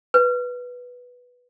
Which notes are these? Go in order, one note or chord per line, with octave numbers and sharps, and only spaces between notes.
B4